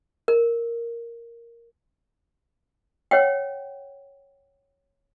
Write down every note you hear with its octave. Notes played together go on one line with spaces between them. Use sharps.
A#4
C#5 F#5 G5